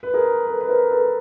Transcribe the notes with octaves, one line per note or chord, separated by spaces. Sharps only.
B4
G#4 A#4
A4 B4
B4
A#4 C5
A4 B4